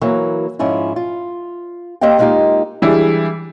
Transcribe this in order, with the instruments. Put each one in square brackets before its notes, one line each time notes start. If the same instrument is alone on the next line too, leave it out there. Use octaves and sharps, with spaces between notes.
[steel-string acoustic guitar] E3 F#3 A#3
G#2 F3 C#4 E4 F4
F4
A#3 C4 G4 D#5 F5 G5
G#3 A#3 D#4 F4 G4
[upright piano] E3 G3 G#3 D4 E4